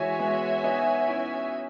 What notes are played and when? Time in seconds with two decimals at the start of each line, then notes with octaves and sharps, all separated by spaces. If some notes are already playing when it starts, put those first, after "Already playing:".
Already playing: E3 G#3 F#4 C#5 E5 G#5
0.19 G#3 B3
0.64 B3 D#4
1.07 C#4 E4